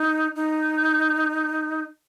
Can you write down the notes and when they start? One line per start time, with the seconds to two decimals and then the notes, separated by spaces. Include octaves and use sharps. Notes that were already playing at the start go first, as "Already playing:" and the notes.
Already playing: D#4
0.36 D#4